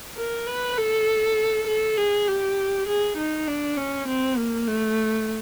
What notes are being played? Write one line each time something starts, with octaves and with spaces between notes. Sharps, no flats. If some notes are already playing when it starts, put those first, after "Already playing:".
A#4
B4
A4
A4
G#4
G4
G#4
D#4
D4
C#4
C4
A#3
A3